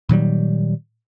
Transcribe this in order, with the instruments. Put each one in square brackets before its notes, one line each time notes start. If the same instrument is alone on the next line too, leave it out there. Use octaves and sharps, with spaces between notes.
[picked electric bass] A#2 D#3 F#3 G3